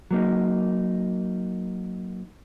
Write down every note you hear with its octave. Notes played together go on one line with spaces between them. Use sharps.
F#3 A#3 D#4